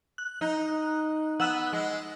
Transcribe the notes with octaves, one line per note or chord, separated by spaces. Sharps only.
F#6
D#4
B3 F#5 E6 F#6
G#3